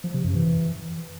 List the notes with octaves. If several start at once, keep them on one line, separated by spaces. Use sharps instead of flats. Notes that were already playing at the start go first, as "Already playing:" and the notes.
F3
C3
F#2
E3